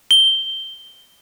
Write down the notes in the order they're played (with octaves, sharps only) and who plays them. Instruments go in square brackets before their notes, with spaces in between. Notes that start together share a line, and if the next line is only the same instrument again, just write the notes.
[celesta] G7